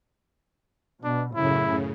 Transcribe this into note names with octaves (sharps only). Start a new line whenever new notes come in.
B2 D4
F#2 A2 C#3 E4